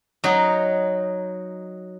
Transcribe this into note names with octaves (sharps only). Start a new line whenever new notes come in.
F#3 D#4